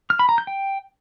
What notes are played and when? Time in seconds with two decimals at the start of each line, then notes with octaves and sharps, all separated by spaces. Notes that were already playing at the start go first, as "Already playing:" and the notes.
0.10 F6
0.19 B5
0.29 A#5
0.38 G6
0.47 G5